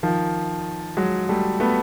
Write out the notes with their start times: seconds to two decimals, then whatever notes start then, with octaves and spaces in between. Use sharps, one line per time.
0.03 D#3 F3
0.97 F#3 G#3
1.29 G3 A3
1.60 A3 B3